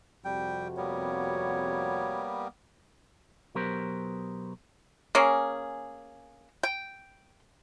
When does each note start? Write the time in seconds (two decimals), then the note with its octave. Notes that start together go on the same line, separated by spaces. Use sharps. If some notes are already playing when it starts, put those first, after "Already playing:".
0.25 F2 C3 G3 F#4 G5
0.77 G3 A#3 B3 C#5
3.55 B1 F#3 B3 G4 A#4 C5
5.15 A#3 C#4 G#4
6.63 G5